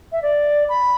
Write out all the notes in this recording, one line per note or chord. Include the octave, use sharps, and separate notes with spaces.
E5
D5
B5